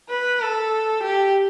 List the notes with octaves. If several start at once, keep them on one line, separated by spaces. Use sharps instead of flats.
B4
A4
G4